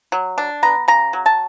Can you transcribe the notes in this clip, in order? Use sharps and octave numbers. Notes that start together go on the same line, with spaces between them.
F#3
D4
B3 A#5
C#3 A#5
F#3
A5